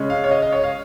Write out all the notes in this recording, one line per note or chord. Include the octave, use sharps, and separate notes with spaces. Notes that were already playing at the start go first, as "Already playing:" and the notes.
Already playing: C#3 G#3 C#4
F5
C#5
D#5
D#5
C#5
F5